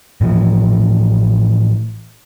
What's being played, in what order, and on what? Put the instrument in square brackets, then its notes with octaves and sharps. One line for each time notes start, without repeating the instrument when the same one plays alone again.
[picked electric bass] A2 E3 F3